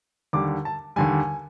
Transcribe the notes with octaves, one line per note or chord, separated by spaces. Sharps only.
D#2 D3 G3 D6
A5
D#2 D3 G3 G#5